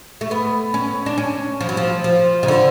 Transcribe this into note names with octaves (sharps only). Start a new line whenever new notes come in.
A3
B3
C#4
D4
C#4
F3
F#3
F3
F3
C#3
D3